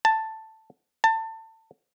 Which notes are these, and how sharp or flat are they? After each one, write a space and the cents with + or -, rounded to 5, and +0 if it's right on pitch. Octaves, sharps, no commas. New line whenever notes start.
A5 +5
A5 +25